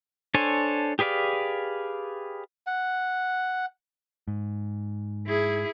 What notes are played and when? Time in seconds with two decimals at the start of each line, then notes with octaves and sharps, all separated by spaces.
0.34 D4 A4 C5 C#5 G#5
0.99 G4 G#4 B4 D5 F5
2.67 F#5
4.28 G#2
5.27 E4 G#4